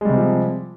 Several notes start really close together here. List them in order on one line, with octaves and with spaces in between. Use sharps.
G#3 G3 C3 C4 F3